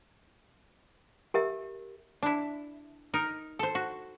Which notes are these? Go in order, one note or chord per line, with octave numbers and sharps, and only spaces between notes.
G4 A#4 E5
D4 E4
D#4 A#4
A4 C5
F#4